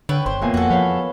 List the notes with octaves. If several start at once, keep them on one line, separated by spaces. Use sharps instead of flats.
D3 B4 C#5 G5
G1 C5
E2 A#2 G#5
F2 F#4 A4
F3 B4 C#5 F5